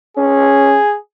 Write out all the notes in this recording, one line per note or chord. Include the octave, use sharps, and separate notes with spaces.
C#4 G#4